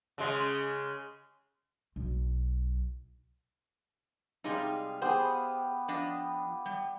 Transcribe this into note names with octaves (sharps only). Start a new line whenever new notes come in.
C#3 G#3
B1
C3 G3 G#3 D#4 F5
B3 G4 G#4 C5 B5
F3 D4 D#5
G3